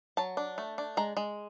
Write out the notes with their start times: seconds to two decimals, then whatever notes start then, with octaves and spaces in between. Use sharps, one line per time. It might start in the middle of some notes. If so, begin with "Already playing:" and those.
0.17 F#3 A5
0.37 D4
0.58 A3
0.78 D4
0.97 G#3 A#5
1.17 G#3